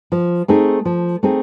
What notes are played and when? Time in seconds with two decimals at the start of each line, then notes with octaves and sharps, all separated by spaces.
0.12 F3
0.48 A3 C4 D#4 G#4
0.85 F3
1.23 A3 C4 D#4 G#4